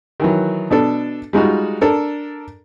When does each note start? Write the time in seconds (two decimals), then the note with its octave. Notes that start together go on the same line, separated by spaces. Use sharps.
0.20 D#3 E3 F#3
0.70 B2 D4 A4
1.33 G3 G#3 D#4 F4 F#4
1.81 D4 A4 A#4